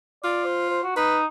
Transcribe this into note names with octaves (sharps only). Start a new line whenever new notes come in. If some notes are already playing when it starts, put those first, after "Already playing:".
F4 D5
C5
C5
F#4
D#4 B4